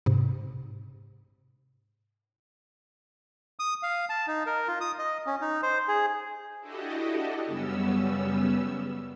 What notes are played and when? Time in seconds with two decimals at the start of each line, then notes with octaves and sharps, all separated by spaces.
0.06 G#2 C3
3.59 D#6
3.83 F5
4.09 A5
4.27 D#4
4.46 A#4
4.68 F4
4.81 D#6
4.99 D#5
5.26 C#4
5.41 D#4
5.63 C5
5.88 G#4
6.60 D4 E4 F#4 G4 A4 D#5
7.46 F#2 C#3 G3 B3 C#4 E6